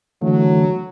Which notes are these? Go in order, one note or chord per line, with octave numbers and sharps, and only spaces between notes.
D3 E3 F#3 A3